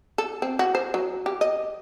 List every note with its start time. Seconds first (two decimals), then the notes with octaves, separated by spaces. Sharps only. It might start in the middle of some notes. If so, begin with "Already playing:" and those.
0.18 A4
0.42 C4
0.59 F#4
0.75 C5
0.94 F#3
1.26 G4
1.41 D#5